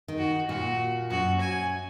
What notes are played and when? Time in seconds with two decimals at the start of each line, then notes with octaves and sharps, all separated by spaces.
0.08 D#3
0.18 F#4
0.49 A#2 F#4
1.10 F#2 F#4
1.41 G#5